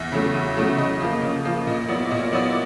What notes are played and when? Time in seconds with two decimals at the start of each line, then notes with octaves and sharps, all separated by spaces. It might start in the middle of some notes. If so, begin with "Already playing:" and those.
Already playing: E2 E5
0.12 C#3 F#3 A3
0.34 E2
0.57 C#3 F#3 A3
0.78 C#3 D#5
1.00 F3 A#3
1.22 C#3
1.45 F3 A#3
1.67 A#2 D#5
1.89 F#3 B3 E4 D5
2.10 A#2 D#5
2.32 F#3 B3 E4 D5